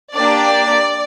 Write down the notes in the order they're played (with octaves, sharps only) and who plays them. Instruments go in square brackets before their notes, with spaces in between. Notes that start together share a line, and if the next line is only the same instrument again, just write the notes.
[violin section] A#3 D4 G4 D5